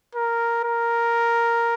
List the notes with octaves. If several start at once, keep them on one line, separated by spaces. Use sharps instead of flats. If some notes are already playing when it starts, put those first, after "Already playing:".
A#4
A#4